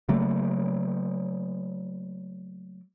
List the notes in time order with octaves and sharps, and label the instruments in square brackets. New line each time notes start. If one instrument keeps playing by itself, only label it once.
[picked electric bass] C#3 F#3 A3 A#3